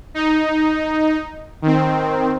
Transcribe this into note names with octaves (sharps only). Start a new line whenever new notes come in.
D#4
D#3 C4